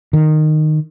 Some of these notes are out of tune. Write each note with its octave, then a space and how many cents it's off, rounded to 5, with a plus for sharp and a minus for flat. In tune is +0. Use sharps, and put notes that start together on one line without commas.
D#3 -15